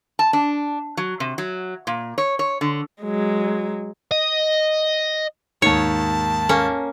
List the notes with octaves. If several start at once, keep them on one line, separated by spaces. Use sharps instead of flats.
A5
D4
F#3
C3
F#3
A#2
C#5
C#5
D3
F#3 G#3
D#5
D#2 G#2 D#3 C#5 A5
A#3 C#4